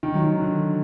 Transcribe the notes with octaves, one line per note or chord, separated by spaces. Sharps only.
D#3
F#3
D#3
D3